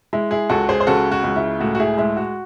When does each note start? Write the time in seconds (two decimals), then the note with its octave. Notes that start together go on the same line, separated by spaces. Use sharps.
0.13 G#3 E4
0.31 E4 G#4
0.50 C#2 F#4 A4
0.69 G#4 C5
0.81 C5
0.87 C#3 F#4 A4
1.12 F#4
1.24 C#2
1.36 E4
1.60 A2 F#4
1.75 F#4
1.80 E4 G#4
1.98 G#3 E4
2.17 F#4